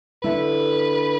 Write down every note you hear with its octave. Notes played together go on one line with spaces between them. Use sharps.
D3 A3 E4 B4